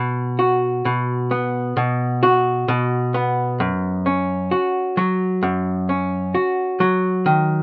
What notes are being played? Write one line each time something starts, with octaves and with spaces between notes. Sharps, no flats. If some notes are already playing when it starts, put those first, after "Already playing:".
Already playing: B2
F#4
B2
B3
B2
F#4
B2
B3
F#2
C#4
F#4
F#3
F#2
C#4
F#4
F#3
D#3